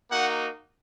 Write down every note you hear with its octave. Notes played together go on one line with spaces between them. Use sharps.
A#3 D#4 F#4 F#5